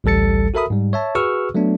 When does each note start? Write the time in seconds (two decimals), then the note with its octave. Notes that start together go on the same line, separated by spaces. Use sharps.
0.04 A1 D2 G3 A4 A6 C#7
0.54 F#4 A4 A#4 E5 B5 D#6
0.70 G#2 G3
0.93 C#5 E5 A5
1.15 F#4 G#4 B4 C#6 E6 F6
1.55 F#3 A3 B3 D4